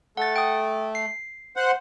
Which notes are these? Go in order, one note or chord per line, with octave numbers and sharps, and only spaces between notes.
A3 F#5 A6
G5 D#6
C7
C5 F#5